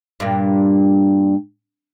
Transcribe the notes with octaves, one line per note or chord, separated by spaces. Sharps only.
G2 A#2